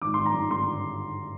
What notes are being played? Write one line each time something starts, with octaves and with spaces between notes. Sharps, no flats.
G#1 D6
G#1 C6
A#5
G2
D3 C6